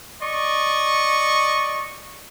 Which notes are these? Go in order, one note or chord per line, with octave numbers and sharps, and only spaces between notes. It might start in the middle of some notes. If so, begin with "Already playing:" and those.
D5 D#5 C#6